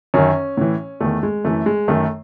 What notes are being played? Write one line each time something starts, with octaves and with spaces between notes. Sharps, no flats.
F#2 D#3 C#4
A2 E3
E2 D#3 A3
G#3
F#2 E3 A3
G#3
F#2 D#3 A3